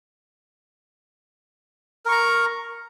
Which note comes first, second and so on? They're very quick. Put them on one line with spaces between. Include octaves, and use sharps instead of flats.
A#4 C#6 A#5